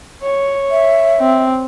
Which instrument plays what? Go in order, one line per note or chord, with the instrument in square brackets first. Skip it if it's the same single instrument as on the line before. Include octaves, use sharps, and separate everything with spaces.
[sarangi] C#5
[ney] E5
[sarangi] C4